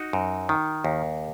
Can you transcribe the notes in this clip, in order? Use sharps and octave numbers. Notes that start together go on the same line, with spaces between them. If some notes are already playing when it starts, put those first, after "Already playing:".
Already playing: D#4 F#4
F#2
D#3
D#2